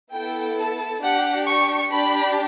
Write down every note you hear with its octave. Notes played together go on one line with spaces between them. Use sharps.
B3 E4 A4 G5
A5
D4 G4 F#5
C#6
D4 G4 B5